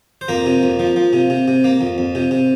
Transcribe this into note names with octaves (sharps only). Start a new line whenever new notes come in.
C5
F2 A#3 A#4
C3
F2
F3
F3
C3
C3
C3
A#3
F2
F2
C3
C3